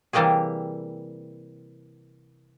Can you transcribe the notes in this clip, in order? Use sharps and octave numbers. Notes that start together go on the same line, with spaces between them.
C3 E3 G3 A#3 G4 G#4